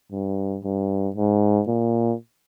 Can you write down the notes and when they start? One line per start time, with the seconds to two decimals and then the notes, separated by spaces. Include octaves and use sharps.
0.12 G2
0.64 G2
1.16 G#2
1.67 A#2